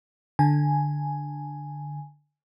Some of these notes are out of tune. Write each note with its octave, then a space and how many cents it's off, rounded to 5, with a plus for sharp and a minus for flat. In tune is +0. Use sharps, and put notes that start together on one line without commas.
D3 +5 G#5 +0